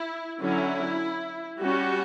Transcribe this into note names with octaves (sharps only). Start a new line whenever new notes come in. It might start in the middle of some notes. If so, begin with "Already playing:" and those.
Already playing: E4
D3 F#3 C#4 E4
G3 C#4 F#4